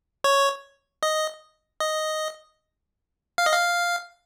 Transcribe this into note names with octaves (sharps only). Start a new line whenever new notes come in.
C#5
D#5
D#5
F5
D#5
F5